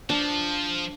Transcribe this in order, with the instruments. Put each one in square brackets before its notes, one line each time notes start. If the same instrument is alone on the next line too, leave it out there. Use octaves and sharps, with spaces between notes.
[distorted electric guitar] F3 [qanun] D4